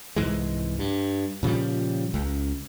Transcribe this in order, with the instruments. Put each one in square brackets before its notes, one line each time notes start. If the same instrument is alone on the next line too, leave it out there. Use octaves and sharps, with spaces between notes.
[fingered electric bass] C2 G#2 E3 G#3
G2
A#2 C#3 F3 G3
C#2